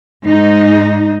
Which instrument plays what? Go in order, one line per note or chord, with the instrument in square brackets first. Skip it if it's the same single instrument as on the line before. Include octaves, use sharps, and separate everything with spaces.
[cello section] G#2 D#4